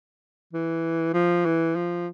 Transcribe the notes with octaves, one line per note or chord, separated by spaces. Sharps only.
E3
F3
E3
F3